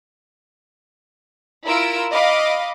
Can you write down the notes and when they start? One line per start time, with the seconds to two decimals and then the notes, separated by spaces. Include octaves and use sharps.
1.66 E4 F4 A#4 E6 D7
2.12 D#5 F5 B5 D6